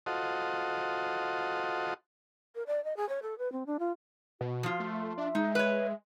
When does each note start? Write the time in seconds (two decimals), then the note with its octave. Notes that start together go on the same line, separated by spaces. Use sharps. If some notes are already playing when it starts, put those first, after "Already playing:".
0.06 F4 F#4 A4 C5 D#5
2.55 A#4
2.67 D5
2.84 D#5
2.97 G#4
3.09 C#5
3.22 A4
3.38 B4
3.52 C4
3.66 D4
3.79 F4
4.41 B2 F#4
4.63 F3 F4
4.80 A3
5.18 D4 E5
5.35 G#3 D#4
5.55 B4 C#5